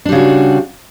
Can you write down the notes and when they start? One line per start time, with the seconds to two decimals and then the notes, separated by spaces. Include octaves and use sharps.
0.05 D4
0.09 G3
0.12 C#3
0.15 F#4